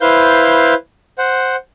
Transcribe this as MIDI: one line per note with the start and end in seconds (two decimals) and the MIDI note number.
0.01 0.74 64
0.01 0.74 71
0.01 0.74 72
0.01 0.74 77
0.01 0.74 91
1.18 1.56 72
1.18 1.56 78